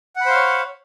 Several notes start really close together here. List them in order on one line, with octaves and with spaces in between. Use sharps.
F#5 B5 C5 F5 C#5